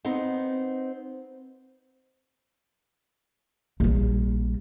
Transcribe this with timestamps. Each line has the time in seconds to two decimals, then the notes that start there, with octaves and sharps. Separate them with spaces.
0.05 B3 C4 D#4
3.80 A#1 G3